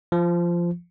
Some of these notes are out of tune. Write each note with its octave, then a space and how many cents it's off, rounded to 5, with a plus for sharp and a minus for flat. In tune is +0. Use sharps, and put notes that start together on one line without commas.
F3 -15